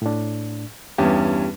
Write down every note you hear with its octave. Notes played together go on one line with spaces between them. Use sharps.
A2 D4
E2 G2 C#4 G4